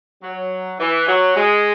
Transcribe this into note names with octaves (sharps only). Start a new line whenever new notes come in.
F#3
E3
F#3
G#3